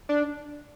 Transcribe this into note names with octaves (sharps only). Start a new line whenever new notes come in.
D4